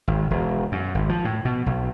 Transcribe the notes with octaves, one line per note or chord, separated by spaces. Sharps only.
G#1
E1
F#2
G#1
F3
A2
B2
B1